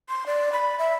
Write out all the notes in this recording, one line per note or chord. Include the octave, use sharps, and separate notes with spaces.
C6
D5
B5
E5